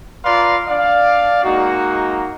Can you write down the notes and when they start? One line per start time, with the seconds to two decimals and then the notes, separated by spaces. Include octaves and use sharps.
0.24 F4 B4 D5 F5 A#5 C6
0.68 D4 D5 F5
1.44 G#3 A#3 D#4 F#4